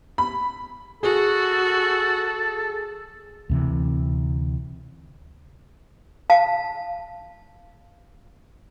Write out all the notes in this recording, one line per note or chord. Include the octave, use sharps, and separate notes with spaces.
B5
F#4 G#4 A4
D2 C3 E3
F5 A5